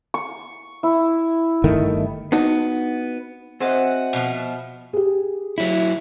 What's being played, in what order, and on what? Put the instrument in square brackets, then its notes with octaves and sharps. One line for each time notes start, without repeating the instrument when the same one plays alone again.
[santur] C#6
E4
[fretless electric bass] G1 D#3 A3
[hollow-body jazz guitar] B3 D4 D#4 F#4
[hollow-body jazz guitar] C4 G#4 C5 [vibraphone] F#4 D#5 E5 [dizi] F#5
[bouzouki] B2 F3
[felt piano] G4 G#4
[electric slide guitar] F#3 E4